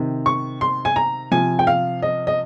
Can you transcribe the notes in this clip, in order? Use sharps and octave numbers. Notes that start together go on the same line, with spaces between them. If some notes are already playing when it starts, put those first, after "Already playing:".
Already playing: C3 D#3
C#6
C6
G#5
A#5
C3 F3 G#5
G5
F5
D#5
D#5